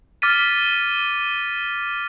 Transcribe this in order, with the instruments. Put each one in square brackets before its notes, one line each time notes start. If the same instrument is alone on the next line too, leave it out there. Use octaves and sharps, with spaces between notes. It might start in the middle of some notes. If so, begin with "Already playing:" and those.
[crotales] D6 F6 A6 B6 D#7